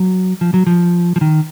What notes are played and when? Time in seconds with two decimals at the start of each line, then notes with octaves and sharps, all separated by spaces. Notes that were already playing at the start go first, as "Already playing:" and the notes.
Already playing: F#3
0.41 F3
0.54 F#3
0.67 F3
1.16 F3
1.21 D#3